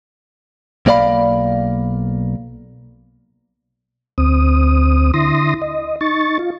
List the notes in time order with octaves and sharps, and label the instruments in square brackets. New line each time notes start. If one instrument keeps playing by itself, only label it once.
[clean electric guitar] B1 A#3 C#5 D5 F5 B5
[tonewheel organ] D2 C4 D#6
D3 E4 C6 D#6 A#6
D#5
D#4 C#6 A6
F4